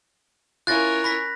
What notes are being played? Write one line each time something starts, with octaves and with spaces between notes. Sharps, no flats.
C#4 E4 F4 A#4 F#6 A6 A#6
B5 A#6 B6